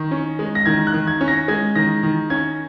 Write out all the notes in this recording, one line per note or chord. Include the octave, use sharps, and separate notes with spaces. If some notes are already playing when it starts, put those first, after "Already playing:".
Already playing: D#3
C#4
G#3
A#6
D#3 G#6
F#6
D#3
G#6
C#4
A#6
G#3 G#6
D#3 A#6
D#3
C#4 G#6